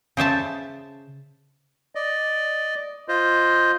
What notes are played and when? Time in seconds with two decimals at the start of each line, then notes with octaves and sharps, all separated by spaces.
0.17 C#3 C5 E5 A5
1.95 D5 D#5
3.08 F4 C5 D#5